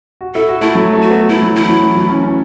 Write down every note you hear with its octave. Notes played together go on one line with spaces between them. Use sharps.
F#4
E4 A4
F#4
A3 E4
F#3
A3
F#4
B3
A3 E4
F#3
E3 E4
F#3
E3
F#3
C#4
C#4